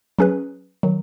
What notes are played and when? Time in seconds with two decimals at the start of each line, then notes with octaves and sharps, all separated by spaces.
0.19 F#3 C#4 G#4 B4
0.83 D#3 F#3